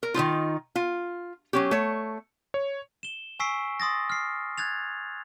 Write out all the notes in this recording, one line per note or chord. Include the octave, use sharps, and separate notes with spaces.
A#4
D#3 G#3 D#4 F4
F4
F#3 C#4 G4
A3 C#5
C#5
E7 G7
G#5 C#6 E6 B6 C7 D7
C6 D#6 A6 A#6
F6 C7
F#6 G#6 A6 F7